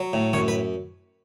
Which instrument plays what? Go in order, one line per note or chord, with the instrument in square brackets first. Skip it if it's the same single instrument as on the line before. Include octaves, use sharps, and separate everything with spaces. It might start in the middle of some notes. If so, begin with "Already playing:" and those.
Already playing: [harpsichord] F#3
A2
F#2 C#5
B4